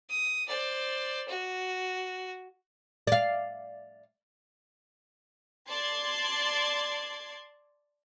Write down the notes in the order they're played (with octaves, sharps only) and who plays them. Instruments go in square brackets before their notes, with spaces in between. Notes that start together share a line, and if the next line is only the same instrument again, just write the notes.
[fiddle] D#6
C5 D5
F#4
[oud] D5 F5
[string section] D5 A5 C6 G#6 C7